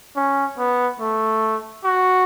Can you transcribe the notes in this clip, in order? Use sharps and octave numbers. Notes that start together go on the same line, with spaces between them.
C#4
B3
A3
F#4